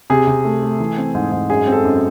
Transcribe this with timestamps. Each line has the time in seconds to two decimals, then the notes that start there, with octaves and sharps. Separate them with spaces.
0.10 C3 G#4
0.27 C3
0.45 A3
0.63 A3
0.80 E3
0.97 C4
1.15 G#2
1.32 G#2
1.49 F#2 G#4
1.67 C4
1.72 A4
1.85 F#2